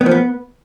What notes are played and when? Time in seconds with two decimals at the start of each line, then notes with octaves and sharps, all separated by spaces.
0.01 B3
0.06 F3
0.11 B3